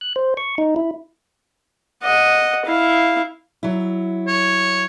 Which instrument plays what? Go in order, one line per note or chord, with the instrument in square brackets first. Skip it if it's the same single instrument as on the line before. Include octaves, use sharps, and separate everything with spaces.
[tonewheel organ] F#6
C5
C#6
D#4
E4
[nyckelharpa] D#5 F#5
E4 F5
[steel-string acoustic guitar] F#3 E4
[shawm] C#5